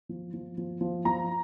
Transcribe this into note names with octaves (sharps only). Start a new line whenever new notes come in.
F3
F3
F3
F3
F3 A#5